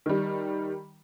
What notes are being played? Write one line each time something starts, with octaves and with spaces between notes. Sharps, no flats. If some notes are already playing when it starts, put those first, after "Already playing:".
D#3 G3